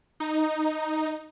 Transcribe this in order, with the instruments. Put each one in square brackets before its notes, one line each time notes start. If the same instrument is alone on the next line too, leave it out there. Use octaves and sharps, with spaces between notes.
[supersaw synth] D#4